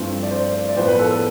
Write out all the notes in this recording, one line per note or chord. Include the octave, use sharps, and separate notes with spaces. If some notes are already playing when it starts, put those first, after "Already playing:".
Already playing: G2 F3 A3 C4 E4
D5
C5
D5
A2 F3 B3 C5
B4
A4
A4